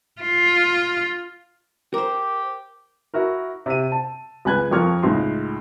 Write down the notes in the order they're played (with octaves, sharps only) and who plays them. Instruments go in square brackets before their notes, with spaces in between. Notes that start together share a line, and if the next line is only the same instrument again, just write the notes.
[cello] F4
[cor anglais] G4 [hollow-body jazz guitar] A#4 C5
[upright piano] E4 F#4 A#4
C3 D#7
A5
C#2 B4 G#5 F#6 G#6
F2 F3 A#4 C#6 F6 G#6
C#2 A2 D#4 C6